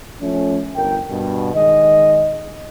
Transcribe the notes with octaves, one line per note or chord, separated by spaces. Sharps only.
F3 A3 C#4
G1 A#4 G5
G2 B2
D#3 G#3 D#5